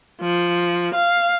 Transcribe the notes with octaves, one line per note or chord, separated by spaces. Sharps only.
F3
F5